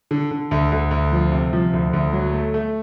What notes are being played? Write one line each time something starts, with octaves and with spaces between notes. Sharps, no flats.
D3
D3
D2
D2
D2
F3
C3
F3
D2
D2
F#3
A3
A3